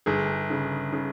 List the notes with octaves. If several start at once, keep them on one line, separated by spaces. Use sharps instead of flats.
G1 G#4
C#3
C#3